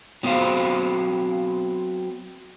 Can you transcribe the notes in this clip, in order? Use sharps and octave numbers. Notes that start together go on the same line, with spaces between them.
F#3 B3 C4 C5 F5